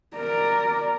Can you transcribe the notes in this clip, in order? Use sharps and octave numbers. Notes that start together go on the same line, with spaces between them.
A#4 D5